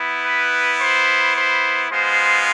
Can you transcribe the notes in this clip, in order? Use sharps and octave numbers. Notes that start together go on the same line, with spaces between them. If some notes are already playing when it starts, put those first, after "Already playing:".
Already playing: B3 E4
B4
C5
C5
G#3 B3 F4 C5